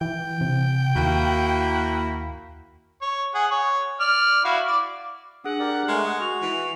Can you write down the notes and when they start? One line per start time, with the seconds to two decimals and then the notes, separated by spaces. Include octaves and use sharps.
0.01 E3 G5
0.41 C3
0.96 D#2 A#3 E4 F#4
3.02 C#5
3.34 G#4 F#5
3.51 C#5
4.00 D5 F6
4.45 E4 F#4 F5
4.66 D5 D6
5.44 D4 G#4 F#5 D#6
5.59 G4 A#4 D5
5.88 G#3 A3 A#4 C7
6.05 F#5 D#6
6.20 F#4 F7
6.42 E3